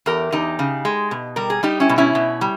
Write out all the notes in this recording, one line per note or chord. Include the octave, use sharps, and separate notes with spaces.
E2 G4 A#4
E2 D#4 G4
C#3
G#3
B2
G3 A#4
G#4
G3 D#4 G4
C#4 E4
B2
C#4 E4
B2
G3